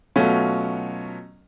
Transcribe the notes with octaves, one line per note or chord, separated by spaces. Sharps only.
B2 F#3 A3 C#4 F4